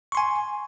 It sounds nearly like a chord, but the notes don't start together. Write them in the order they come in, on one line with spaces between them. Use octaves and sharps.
C#6 C6 G#5